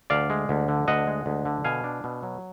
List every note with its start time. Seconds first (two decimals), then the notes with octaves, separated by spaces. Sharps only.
0.10 D2 D5 F5
0.30 G#3
0.49 D2
0.68 D3
0.88 D2 D#5 F#5
1.07 G#3
1.26 D2
1.45 D3
1.64 B2 F5 G#5
1.84 D4
2.04 B2
2.23 F#3